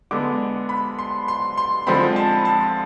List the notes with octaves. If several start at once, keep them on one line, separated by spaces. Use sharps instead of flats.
D3 G#3 B3 D6
B5
C6
C6
C6
D3 F3 G#3 C4 B5
A5
A5